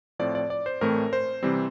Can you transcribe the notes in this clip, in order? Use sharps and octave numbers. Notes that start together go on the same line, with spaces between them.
A2 F3 C4 D5
D5
D5
C5
A2 E3 A3 C4 A#4
C5
C3 E3 G3 C4